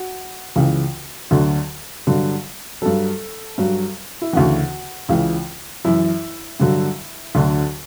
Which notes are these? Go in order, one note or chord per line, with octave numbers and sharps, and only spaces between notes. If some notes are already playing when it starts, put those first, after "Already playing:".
Already playing: F#4
C#2 C#3 E3
D2 D3 F#3
G2 D3 F#3
G2 F#3 A4
G2 F#3
E4
D2 C#3 E3 F#4
C#2 C#3 E3
F#2 E3 E4
G2 D3 F#3
D2 D3 F#3